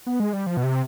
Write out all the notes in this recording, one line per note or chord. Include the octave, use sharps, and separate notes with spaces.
B3
G#3
G3
F3
B2
C3